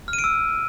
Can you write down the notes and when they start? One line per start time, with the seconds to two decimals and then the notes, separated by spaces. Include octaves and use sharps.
0.08 F6
0.13 D#7
0.19 D7
0.24 E6